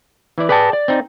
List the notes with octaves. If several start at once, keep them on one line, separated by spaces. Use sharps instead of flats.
E3 E4 D5
G#4 B4 D5 G5 A5
D5
C4 D#4